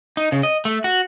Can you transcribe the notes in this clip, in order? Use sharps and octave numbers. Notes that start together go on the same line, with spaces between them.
D#4
C#3
D#5
A3
F#4